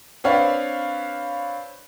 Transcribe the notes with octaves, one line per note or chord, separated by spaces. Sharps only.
C4 D4 B4 C#5 F5